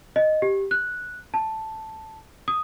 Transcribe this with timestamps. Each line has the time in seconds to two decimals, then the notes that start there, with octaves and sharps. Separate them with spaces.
0.16 D#5
0.42 G4
0.71 F#6
1.34 A5
2.48 D#6